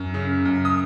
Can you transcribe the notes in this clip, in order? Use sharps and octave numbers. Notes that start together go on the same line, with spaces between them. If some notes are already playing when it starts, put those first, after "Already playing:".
Already playing: F#2
C#3
F#2
D#6